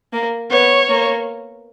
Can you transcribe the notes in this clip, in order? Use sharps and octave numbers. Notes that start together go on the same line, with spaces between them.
A#3
B3 C#5
A#3